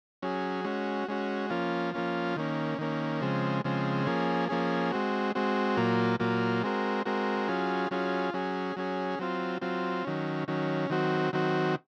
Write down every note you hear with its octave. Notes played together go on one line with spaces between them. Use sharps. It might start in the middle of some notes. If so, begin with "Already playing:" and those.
F#3 C#4 G#4
G#3 C#4 F#4
G#3 C#4 F#4
F3 A#3 C#4 F4
F3 A#3 C#4 F4
D#3 A#3 C#4
D#3 A#3 C#4
C#3 F3 G#3 C4
C#3 F3 G#3 C4
F3 A#3 C#4 G#4
F3 A#3 C#4 G#4
G#3 C4 F#4
G#3 C4 F#4
A#2 F#3 A#3 F4
A#2 F#3 A#3 F4
G#3 C4 F#4 A#4
G#3 C4 F#4 A#4
F#3 C#4 F4 G#4
F#3 C#4 F4 G#4
F#3 C#4 G#4
F#3 C#4 G#4
F#3 C4 F4
F#3 C4 F4
D#3 F#3 C#4
D#3 F#3 C#4
D#3 F#3 C4 F#4
D#3 F#3 C4 F#4